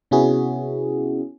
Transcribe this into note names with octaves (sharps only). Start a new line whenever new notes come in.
C3 B3 C#4 E4 F#4 G#4